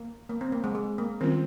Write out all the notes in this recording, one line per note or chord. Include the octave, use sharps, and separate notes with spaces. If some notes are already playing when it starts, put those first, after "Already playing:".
Already playing: A#3
A#3
C4
A#3
G#3
G#3
A#3
D#3 G3 C4 C#4 F4 A#4